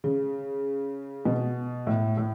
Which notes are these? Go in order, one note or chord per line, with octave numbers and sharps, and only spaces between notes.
C#3
B2
A2
A2